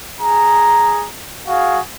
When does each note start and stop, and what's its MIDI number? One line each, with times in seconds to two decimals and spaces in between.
0.21 1.06 68
0.21 1.06 82
1.48 1.80 66
1.48 1.80 68
1.48 1.80 77